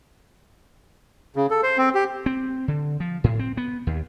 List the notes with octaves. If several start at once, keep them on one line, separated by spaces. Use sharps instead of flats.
C#3
A4
C5
C4
G4
C4
D3
F3
A2
C4
B3
D#2